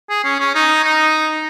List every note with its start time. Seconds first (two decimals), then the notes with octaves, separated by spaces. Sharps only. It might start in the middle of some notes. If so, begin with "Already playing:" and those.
0.10 G#4
0.24 C#4
0.40 C#4
0.55 D#4
0.84 D#4